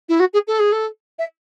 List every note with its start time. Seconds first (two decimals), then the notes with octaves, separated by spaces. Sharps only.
0.09 E4
0.19 F#4
0.33 G#4
0.47 A4
0.59 G#4
0.72 A4
1.18 E5